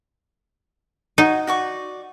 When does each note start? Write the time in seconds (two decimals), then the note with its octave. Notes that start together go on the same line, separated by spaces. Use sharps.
1.18 D#4 F#4 C#5
1.47 F#4 D5 C#6